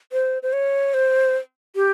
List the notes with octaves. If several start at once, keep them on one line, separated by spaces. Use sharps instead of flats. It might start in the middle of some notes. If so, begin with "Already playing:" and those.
C5
C5
C#5
C5
G4